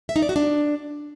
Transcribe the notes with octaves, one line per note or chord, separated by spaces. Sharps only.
E5
D#4
D5
F#4
D4